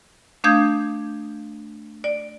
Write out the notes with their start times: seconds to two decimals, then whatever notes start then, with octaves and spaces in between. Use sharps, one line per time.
0.44 A3 D4 F5 D#6 G6 G#6
2.04 D5